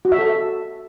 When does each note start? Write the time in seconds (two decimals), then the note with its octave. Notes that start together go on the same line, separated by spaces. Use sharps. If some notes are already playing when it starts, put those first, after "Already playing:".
0.05 F#4
0.12 E5
0.19 A4